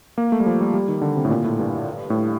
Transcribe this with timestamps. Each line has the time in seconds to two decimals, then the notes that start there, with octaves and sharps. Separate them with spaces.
0.18 A#3
0.32 A3
0.40 G3
0.46 F3
0.61 G3
0.74 G3
0.88 D#3
1.01 D3
1.16 C3
1.25 A2
1.30 A#2
1.44 A2
1.59 G2
2.10 A2